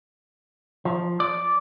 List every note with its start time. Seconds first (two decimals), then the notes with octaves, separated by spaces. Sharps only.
0.85 F3
1.20 D5